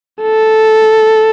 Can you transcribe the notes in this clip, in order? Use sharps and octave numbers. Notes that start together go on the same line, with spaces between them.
A4